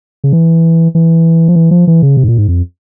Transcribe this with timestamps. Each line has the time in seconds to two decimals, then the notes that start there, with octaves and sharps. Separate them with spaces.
0.24 C#3
0.33 E3
0.95 E3
1.48 F3
1.56 E3
1.71 F3
1.87 E3
2.02 C#3
2.17 C3
2.24 G#2
2.28 A#2
2.38 G#2
2.48 F2